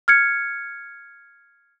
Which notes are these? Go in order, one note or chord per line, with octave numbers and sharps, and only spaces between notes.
F6 G#6 C#7